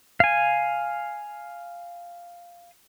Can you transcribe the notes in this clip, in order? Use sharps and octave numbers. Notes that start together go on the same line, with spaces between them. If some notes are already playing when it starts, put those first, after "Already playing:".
F5 G#5